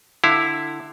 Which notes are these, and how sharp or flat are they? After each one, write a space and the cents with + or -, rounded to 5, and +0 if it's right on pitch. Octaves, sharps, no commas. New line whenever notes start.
D3 +15 E4 +0 F5 +0